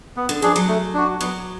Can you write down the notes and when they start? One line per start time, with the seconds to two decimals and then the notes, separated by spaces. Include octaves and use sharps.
0.17 B3
0.29 D3
0.42 F3 D4 G#4
0.56 F#3
0.68 A3
0.94 D4 F#4
1.20 F#3 B3